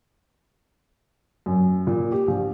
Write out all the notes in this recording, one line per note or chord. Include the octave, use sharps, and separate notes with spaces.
F#2
A#2
G4
A#1